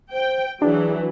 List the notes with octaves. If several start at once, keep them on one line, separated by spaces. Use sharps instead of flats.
C5 G5
E3 F#3 D4 G#4